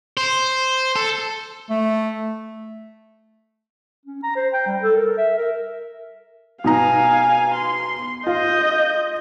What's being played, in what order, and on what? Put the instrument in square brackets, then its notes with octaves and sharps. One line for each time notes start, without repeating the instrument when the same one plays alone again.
[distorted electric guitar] C5
A4
[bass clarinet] A3
[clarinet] C#4
A#5
C5
G5
G3
A4
A#4
E5
A#4
[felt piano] B2 D#4 A#5 [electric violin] F5 G#5
[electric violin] C6
[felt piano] F4 [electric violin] D#5 G6